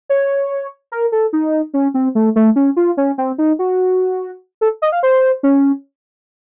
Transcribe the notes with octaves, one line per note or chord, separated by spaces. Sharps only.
C#5
A#4
A4
D#4
C#4
C4
A3
A3
C#4
F4
C#4
C4
D#4
F#4
A4
D#5
F5
C5
C#4